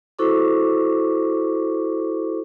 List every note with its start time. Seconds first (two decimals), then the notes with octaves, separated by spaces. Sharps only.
0.19 E4 F#4 A4 C5 C#6 D6